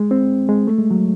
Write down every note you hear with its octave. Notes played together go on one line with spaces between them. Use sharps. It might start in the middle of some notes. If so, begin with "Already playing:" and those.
Already playing: G#3
C4
G#3
A3
G#3
F#3